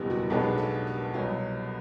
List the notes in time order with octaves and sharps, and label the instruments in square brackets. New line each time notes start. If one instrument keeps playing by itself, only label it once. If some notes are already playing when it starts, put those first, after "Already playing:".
Already playing: [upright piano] F#1 E2 B2 G3 B3 [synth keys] G4 A#4 B4
[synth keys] F#4
[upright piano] B1 B2 G#3 B3 D4 [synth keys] G4
[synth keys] A4
B4
[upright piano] C2 B2 F#3